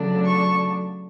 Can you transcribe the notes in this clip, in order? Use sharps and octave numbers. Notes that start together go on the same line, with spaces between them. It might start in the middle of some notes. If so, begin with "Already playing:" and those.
Already playing: C#3 F#3 A3 D4
C#6